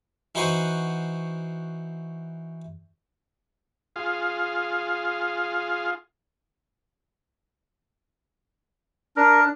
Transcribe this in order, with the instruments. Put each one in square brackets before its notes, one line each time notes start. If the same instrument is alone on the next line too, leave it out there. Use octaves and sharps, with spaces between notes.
[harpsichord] E3 D#4 F#4 C5 F#5 G#5
[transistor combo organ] F4 G#4 F5
[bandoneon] D4 [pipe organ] A#4